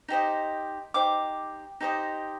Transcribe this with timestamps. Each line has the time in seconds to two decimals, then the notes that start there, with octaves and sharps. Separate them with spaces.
0.08 D#4 G4 C5 D#5
0.94 D#4 G4 C5 D6
1.81 D#4 G4 C5 D#5